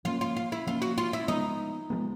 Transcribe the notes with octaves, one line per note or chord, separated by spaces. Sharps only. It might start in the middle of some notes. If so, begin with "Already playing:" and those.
F3 A#3 C#4 F4
F4
F4
E4
F3 A#3 C#4 F4
F#4
F4
E4
F3 G#3 B3 D#4
F3 G#3 B3